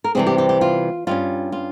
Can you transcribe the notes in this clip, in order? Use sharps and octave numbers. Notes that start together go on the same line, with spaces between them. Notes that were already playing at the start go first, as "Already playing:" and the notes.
A#4
C3 E3 G3 C4 G#4
G4
G4
G4
F4
G2 G3 C#4 F4
F4